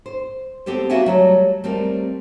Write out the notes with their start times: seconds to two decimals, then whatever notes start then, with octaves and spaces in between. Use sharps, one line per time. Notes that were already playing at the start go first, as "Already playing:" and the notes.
0.06 C5
0.66 B3 C4 G4 A4 C5
0.90 A#3 F#4 E5 F#5 G#5
1.06 F#3 G3 A3
1.64 G3 A3 C4 A#4